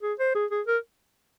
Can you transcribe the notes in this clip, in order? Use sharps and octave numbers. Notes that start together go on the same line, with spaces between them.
G#4
C5
G#4
G#4
A#4